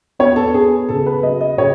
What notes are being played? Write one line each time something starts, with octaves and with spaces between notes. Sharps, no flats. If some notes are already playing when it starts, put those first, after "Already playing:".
B3 C#5
A4
B3 G#4
C#3 A4
B4
F#3 D#5
D#5
C#3 C#5